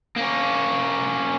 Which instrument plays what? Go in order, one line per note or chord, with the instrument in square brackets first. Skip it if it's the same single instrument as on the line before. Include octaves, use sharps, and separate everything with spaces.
[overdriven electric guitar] A#3 C#4